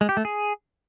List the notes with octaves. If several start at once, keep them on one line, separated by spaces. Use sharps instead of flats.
G#3
G4
A3
G#4